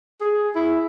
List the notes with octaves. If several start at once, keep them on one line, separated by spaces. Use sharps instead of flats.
G#4
E4